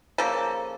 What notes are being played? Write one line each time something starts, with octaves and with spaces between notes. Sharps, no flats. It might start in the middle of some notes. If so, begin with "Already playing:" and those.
C#3 F3 A#3 A4